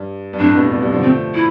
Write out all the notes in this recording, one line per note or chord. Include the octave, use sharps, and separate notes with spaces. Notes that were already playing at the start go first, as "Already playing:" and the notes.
Already playing: G2
G2
F2 A2 D4
A2
G2 B2
G2 B2
G2 B2
D3 F3
F3 A3 C4
E4